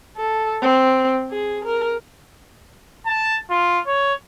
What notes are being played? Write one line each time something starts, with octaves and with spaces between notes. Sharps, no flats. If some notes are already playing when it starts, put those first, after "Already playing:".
A4
C4
G#4
A#4
A5
F4
C#5